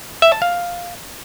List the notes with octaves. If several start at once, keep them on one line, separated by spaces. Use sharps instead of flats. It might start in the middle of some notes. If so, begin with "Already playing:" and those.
E5
A5
F5